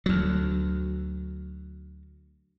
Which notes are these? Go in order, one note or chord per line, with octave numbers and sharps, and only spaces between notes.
D2 F#3